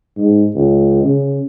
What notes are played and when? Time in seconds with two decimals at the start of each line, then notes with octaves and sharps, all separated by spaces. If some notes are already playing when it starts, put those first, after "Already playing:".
0.17 G#2
0.55 C#2
1.04 C#3